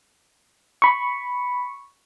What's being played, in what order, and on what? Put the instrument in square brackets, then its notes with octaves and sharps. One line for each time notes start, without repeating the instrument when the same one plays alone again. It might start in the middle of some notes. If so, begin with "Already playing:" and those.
[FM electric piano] B5 C#6